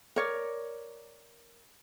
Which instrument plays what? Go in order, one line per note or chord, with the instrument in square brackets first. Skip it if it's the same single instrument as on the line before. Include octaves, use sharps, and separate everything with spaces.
[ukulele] A#4 C#5 D5